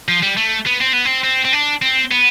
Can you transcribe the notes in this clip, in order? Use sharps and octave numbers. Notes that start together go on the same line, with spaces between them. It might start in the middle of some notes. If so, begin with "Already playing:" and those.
F3
G3
A3
B3
C4
B3
C4
C4
C4
D4
C4
B3